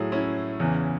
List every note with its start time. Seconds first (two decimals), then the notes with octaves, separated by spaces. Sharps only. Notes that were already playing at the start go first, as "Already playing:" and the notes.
Already playing: A2 F#3 E4 G#4
0.12 C#4 E4
0.60 E2 C#3 E3